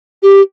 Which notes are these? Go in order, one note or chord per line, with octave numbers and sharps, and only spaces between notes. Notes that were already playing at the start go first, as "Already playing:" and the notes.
G4